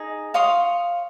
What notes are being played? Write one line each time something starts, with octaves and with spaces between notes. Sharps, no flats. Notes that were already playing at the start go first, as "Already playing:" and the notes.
Already playing: D#4 G#4
C#5 F5 C6 D#6